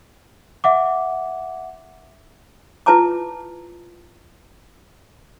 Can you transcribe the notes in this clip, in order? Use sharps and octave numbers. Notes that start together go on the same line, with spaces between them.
E5 F#5 D6
E4 F4 B4 A5 A#5 D6